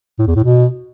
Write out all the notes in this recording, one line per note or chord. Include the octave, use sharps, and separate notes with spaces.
A2
E2
A2
B2